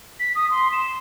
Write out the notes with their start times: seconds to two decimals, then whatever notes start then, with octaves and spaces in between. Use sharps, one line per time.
0.19 B6
0.35 D#6
0.50 C6
0.72 E7